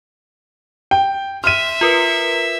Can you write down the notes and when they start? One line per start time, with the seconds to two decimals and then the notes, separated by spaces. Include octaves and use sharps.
0.91 G5
1.44 E5 C6 F6 D#7
1.81 F4 A#4 B4